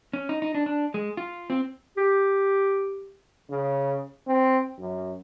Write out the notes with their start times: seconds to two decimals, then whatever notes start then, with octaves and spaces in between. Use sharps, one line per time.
0.13 C#4
0.29 D#4
0.42 D#4
0.55 D4
0.66 D4
0.94 G#3
1.17 F4
1.50 C4
1.98 G4
3.50 C#3
4.27 C4
4.78 F#2